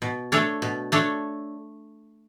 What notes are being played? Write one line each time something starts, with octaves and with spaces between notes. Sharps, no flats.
B2
A3 D4 A4 C#5
B2
A3 D4 A4 C#5